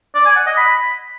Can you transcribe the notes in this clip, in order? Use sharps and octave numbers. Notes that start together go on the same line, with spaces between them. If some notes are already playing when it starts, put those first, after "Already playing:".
D5
G#5
F#5
D#5
B5